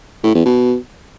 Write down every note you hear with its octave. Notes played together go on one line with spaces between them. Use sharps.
A2
E2
B2